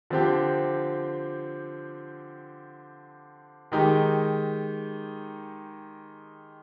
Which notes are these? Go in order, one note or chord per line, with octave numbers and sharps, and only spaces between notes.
D3 F3 C4 G4
D#3 G#3 D#4 G4